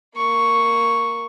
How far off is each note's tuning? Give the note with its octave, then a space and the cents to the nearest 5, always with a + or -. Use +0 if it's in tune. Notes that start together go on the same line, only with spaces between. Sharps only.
A#3 +0 C#6 +0